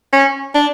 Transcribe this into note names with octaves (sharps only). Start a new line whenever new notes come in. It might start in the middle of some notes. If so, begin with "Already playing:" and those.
C#4
D4